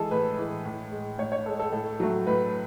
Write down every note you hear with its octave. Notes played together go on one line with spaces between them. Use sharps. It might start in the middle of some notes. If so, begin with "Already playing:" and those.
Already playing: E3 G#3 G#4 A4
A2 B4
E3 G#3
A2
G#3
A2 C#5
C#5
G#3 A4
A4
A2 A4
F#3 A3
A2 B4